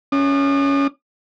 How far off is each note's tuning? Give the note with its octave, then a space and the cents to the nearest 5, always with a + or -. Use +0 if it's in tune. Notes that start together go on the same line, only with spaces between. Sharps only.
C#4 +10 D#6 -45